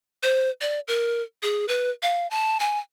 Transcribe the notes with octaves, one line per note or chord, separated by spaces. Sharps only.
C5
D5
A#4
G#4
B4
F5
A5
G#5